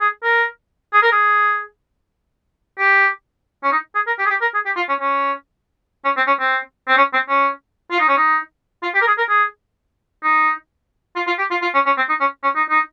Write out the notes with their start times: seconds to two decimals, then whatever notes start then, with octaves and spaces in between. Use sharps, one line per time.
0.01 G#4
0.23 A#4
0.93 G#4
1.02 A#4
1.12 G#4
2.78 G4
3.63 C#4
3.72 D#4
3.95 G#4
4.07 A#4
4.19 G4
4.25 G#4
4.30 G4
4.41 A#4
4.54 G#4
4.65 G4
4.76 F4
4.89 C#4
5.00 C#4
6.05 C#4
6.17 C4
6.27 C#4
6.40 C4
6.88 C4
6.97 C#4
7.13 C4
7.29 C#4
7.91 F4
8.00 D#4
8.08 C#4
8.17 D#4
8.83 F4
8.94 G4
9.01 A#4
9.07 G#4
9.18 A#4
9.29 G#4
10.23 D#4
11.16 F4
11.27 F4
11.38 G4
11.50 F4
11.62 F4
11.74 C#4
11.86 C#4
11.97 C4
12.09 D#4
12.20 C#4
12.43 C#4
12.55 D#4
12.69 D#4